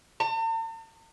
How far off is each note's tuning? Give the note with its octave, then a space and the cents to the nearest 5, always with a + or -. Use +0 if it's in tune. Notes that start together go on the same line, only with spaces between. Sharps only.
A5 +45